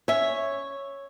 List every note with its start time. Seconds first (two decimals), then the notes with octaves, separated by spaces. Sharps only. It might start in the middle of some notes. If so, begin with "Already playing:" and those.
0.08 C#4 C#5 E5